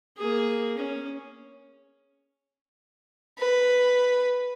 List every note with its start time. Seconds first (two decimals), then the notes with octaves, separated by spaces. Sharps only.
0.17 A#3 G#4
0.78 C#4
3.38 B4